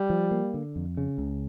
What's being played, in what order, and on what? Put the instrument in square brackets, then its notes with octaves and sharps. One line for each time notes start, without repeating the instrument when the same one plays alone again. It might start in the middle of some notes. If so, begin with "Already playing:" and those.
Already playing: [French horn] G3
[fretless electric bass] F3
A#3
D3
F2
C#3
C#2